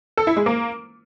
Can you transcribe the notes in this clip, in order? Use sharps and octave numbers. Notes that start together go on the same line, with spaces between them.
A4
E4
G#3
A#3